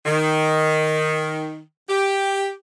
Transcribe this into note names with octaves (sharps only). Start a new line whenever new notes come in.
D#3
G4